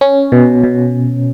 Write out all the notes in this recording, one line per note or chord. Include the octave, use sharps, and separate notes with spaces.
C#4
B2
B2